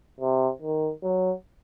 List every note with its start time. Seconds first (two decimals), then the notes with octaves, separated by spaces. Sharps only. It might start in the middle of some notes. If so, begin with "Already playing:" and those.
0.20 C3
0.62 D#3
1.03 F#3